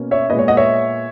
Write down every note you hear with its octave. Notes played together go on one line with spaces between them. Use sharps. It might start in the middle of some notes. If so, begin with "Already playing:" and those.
Already playing: B2 A#3 C#4
C#5 E5
A#2 G#3 B3 B4 D#5
C#5
D#5 F#5
C#5 E5